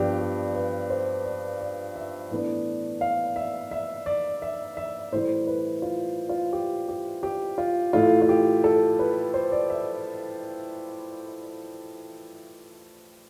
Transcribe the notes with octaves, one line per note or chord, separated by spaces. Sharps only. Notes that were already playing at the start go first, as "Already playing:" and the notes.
Already playing: G2 F3 B3 D4 G4
G4
B4
C5
D5
D5
E5
A2 E3 B3 D4
F5
E5
E5
D5
E5
E5
A2 E3 G3 C5
B4
F4
F4
G4
G4
G4
F4
A2 E3 A3 F4
F4
G4
A4
B4
C5
D5
E5